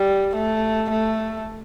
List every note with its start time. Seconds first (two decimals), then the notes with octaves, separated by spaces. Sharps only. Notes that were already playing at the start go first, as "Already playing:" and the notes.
Already playing: G3
0.36 A3
0.91 A3